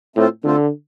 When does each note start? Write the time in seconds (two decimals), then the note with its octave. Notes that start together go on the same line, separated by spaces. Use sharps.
0.16 A2 A3 C4 F4 A4 C5
0.44 D3 A3 C4 F4 A4 C5